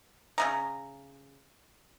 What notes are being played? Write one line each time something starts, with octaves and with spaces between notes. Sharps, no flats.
C#3 D#4 A#5